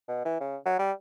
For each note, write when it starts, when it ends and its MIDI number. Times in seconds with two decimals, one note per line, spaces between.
0.08 0.24 47
0.25 0.36 52
0.41 0.56 49
0.66 0.77 54
0.79 0.92 55